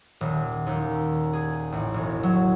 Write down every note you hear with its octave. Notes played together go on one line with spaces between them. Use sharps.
D#1
D#2
G#4
A1
E1
F#3